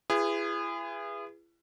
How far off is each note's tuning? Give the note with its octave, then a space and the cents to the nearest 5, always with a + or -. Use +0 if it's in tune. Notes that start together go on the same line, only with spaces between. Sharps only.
E4 +40 G#4 -25 B4 +0